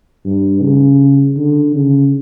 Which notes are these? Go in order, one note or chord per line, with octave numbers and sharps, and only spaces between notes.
G2
C#3
D3
C#3